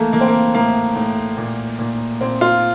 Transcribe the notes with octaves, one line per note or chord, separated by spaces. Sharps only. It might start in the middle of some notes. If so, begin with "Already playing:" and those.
Already playing: E3 A3 A#3
E3 A#3
C4
A#3
A2 A#3
A2
A#2
A#2
A#2 C4
F4